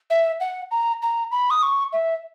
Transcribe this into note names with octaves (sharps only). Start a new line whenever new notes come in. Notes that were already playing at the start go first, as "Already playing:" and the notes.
E5
F#5
A#5
A#5
B5
D#6
C#6
E5